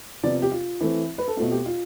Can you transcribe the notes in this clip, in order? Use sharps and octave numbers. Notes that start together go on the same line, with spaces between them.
C3 F3 B3 D5
G4
F4
E3 A3 C4 E4
B4
A4
B2 A3 C4 F4
G4
F4